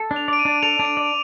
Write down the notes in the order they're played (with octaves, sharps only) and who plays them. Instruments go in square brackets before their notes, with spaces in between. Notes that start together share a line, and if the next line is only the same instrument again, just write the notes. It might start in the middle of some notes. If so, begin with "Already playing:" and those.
Already playing: [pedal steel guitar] A4
D4
[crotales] F7
[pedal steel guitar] D5 [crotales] D7
[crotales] D#7
[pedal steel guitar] D4
[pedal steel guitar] A4 [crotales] F7
[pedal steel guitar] D4
[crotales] D7
[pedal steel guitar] D5